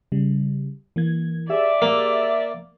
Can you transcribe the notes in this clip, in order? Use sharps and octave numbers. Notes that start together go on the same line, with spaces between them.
C#3 G3
E3 A#3 G#6
G4 G#4 D5 E5
A#3